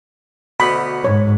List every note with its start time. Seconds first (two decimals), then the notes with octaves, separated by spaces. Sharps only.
0.60 D2 B2 B3 B5
1.04 G#2 C#5